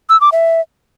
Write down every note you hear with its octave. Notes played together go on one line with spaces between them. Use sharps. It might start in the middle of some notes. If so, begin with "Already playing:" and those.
E6
D6
E5